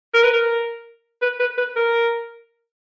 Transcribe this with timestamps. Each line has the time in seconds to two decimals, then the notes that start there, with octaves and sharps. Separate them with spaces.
0.14 A#4
0.24 B4
0.33 A#4
1.22 B4
1.40 B4
1.57 B4
1.76 A#4